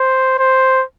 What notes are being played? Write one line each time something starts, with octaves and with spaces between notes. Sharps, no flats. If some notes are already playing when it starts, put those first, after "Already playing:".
Already playing: C5
C5